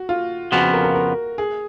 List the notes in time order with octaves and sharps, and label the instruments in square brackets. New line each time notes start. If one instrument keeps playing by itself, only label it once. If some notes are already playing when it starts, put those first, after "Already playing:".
Already playing: [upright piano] F#4
F4
[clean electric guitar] F2 C#3 F3 B3 [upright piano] F#4
[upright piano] A#4
A#4
A#4
G#4